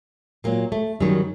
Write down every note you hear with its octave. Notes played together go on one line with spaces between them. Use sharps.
A#2 F#3 A#3
A3
F#2 D#3 F#3 G3